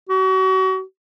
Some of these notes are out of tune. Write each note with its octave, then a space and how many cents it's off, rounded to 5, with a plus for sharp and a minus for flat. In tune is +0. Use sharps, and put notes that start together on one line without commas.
F#4 +35